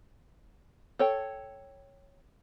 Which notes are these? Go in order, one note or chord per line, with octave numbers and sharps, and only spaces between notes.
A4 C#5 G5